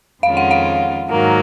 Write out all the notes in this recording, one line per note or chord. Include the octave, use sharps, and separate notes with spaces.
F2 D#3 G#3 C#4 F4 F5
F#5
F5
G#2 D#3 F#3 A#3